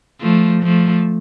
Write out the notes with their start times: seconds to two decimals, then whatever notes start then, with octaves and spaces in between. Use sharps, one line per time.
0.20 F3 A3
0.63 F3 A3